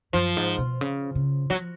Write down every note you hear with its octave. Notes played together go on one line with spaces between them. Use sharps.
F#2 F3
G#2
B2
C#3
C#3
F3 F#3